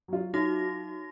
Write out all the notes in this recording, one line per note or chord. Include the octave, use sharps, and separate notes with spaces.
F#3 F4
D#4 F#4 A#6